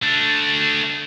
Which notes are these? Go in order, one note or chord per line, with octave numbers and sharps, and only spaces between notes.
A3 D4